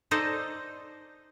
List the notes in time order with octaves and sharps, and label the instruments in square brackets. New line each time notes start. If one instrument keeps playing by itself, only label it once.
[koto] D#4 A4 C5 D5 D#5